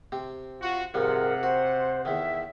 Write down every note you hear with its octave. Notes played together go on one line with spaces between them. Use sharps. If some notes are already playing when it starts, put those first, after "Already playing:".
C3 C4
F4 F#4
G#2 C3 F3 G3 A#4 F#5
F#4 C5
E2 D#3 E5